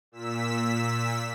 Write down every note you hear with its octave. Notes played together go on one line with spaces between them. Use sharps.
A#2 E6 B6